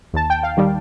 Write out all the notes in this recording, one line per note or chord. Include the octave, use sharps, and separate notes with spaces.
D#2 A5
G5
F5
D#3 G3